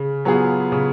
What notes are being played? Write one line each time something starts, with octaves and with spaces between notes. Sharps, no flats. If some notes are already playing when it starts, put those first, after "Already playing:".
Already playing: C#3
F#3 B3 F4 G#4
C#3